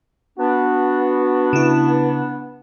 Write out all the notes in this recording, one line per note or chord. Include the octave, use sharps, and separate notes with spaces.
B3 D4 F#4
C#3 E4